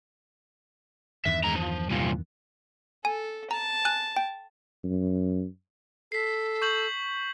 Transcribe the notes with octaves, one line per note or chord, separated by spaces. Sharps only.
E2 G2 D#3 E5
G#3 A#5
F3
C2 A#2
A4 G#5
A5 A#5
G#5 F#6
G5
F#2
A4 B6 C7
C#6 G6 F#7